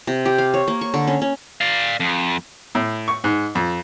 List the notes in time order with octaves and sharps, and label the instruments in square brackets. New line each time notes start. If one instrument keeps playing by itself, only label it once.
[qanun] C3
G4
F5
C#5
A#3
C#6
D3
C#4
C#4
[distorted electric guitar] D5 F5
F2
[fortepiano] A2
C#6
G#2
F2